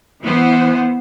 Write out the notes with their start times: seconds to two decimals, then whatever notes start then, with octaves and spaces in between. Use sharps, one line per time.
0.21 E3 B3 C5